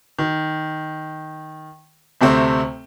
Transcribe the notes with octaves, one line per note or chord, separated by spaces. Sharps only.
D#3
D2 C3 A3 C4